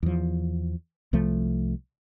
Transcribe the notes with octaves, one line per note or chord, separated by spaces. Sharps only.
E2 F3
C2 F3 A3